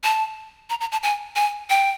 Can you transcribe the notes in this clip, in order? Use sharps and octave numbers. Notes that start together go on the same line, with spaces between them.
A5
A#5
A#5
A5
G#5
G#5
G5